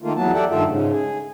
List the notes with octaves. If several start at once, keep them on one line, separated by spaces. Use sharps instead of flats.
D#3 A3 A#3 F4
E2 E3 F#3 B3 A5
G4 A4 D5 E5 F#5 G5
G2 D#3 A3 F4 A4 E5
G#2 C#3
G#4